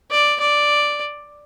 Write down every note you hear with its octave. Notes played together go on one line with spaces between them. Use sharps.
D5
D5